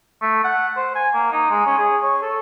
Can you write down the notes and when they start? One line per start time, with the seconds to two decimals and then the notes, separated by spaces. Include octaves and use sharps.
0.22 A3
0.44 F#5
0.77 C5
0.95 G#5
1.14 A#3
1.32 D#4
1.51 G#3
1.66 C#4
1.78 G#4
2.02 C#5
2.22 A4